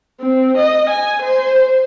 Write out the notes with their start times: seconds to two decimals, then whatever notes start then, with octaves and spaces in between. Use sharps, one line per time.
0.21 C4
0.58 D#5
0.90 G#5
1.22 C5